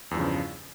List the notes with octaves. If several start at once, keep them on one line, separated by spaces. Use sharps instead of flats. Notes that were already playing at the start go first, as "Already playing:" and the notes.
E2 G2 C#3 F3